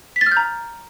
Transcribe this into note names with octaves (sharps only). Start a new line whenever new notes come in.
B6
A6
F6
G6
A#5